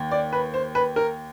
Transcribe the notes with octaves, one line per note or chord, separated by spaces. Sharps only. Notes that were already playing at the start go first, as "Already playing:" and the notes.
Already playing: D#2
D5
B4
C5
B4
A#4